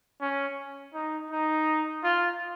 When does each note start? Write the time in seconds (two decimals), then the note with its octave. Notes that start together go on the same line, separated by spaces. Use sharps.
0.21 C#4
0.94 D#4
1.31 D#4
2.04 F4